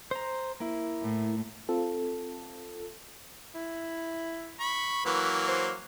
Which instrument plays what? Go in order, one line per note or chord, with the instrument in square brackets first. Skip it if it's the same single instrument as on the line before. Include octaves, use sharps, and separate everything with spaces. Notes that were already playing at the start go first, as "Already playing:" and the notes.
[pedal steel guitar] C5 A#5
A#3 E4
[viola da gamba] A2
[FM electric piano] C4 F4 A4
[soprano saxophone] E4
[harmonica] B5 C#6
[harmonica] E3 F#3 A#3 [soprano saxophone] B4
[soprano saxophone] C5